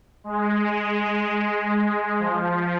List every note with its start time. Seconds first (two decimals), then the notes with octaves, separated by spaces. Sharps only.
0.24 G#3
0.73 G#3
2.19 F3